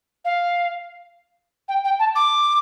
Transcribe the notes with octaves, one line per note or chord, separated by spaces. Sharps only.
F5
G5
G5
A5
D6